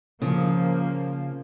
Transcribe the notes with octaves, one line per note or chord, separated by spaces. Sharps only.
C#3 F3 A#3